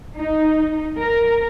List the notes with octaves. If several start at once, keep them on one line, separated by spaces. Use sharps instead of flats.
D#4
A#4